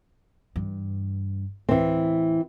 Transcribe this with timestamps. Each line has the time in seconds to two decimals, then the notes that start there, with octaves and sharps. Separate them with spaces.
0.56 G2 E3
1.69 D2 A2 E3 C4